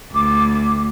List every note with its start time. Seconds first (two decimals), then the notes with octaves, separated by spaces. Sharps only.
0.12 D2 D6